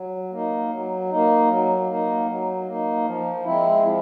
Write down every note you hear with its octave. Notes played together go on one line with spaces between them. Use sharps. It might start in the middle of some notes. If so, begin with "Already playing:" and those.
Already playing: F#3
A#3 D#4
F#3
A#3 D#4
F#3
A#3 D#4
F#3
A#3 D#4
F3
G#3 C4 E4
F3